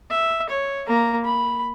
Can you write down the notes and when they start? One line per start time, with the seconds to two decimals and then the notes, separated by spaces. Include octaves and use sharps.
0.10 E5
0.50 C#5
0.87 A#3 A#5
1.25 B5